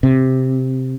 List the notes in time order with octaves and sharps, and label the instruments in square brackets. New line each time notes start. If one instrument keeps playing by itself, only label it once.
[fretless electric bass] C3